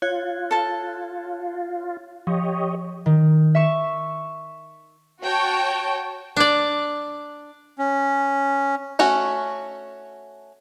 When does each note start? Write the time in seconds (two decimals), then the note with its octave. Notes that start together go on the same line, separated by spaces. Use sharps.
0.02 F4 C#5 F#6 G#6
0.51 A4 A5
2.27 F3 G4 C#5 D#5
3.06 D#3
3.55 E5 C#6 E7
5.23 F#4 C#5 G5 A5
6.36 D4 D5
7.79 C#4
8.99 A3 C#4 F#4